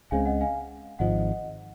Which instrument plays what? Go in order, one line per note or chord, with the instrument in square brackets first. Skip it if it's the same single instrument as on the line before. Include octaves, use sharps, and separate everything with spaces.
[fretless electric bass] C#2 C#3 G#3 C4 [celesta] F5 G#5
[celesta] D#5 F#5
F5 G#5
[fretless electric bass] G#1 G#2 F3 [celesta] D#5 F#5